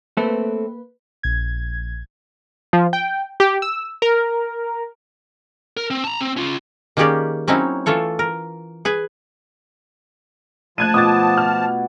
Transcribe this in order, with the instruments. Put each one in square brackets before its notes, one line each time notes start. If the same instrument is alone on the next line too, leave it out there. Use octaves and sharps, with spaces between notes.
[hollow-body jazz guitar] A3 C4 A4 [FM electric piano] A#3 B4
[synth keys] A#1 G#6
[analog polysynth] F3
G5
G4
E6
A#4
[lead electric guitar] A#4
C4
A5 A#5
C4
C#4 F4
[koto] D#3 A#3 C#4 G4 G#4 D5
F#3 C4 C#4 D#4 E4
E3 A3 F4 A4 C#5
A#4
G#4 B4 G#5
[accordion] F3 A5 [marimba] A3 [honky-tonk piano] F#6 G#6 D#7
[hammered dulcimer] B2 F#4 D6 [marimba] F4 [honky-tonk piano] D#6 A6
[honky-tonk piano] F6